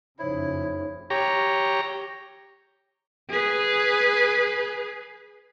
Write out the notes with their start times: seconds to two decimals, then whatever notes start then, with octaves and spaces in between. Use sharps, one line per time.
0.19 F#1 F2 C#3 D#4 E4 C5 C#5
1.10 G4 C#5 A#5
3.30 G#4 B4